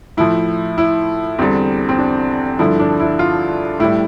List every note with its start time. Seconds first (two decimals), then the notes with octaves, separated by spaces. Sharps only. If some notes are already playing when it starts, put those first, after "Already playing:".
0.17 A2 F3 E4
0.78 E4
1.38 E2 D3 G3 C4
1.89 C4
1.98 D4
2.59 G2 D3 F3 E4
2.80 D4
3.00 E4
3.19 F4
3.80 A2 G3 E4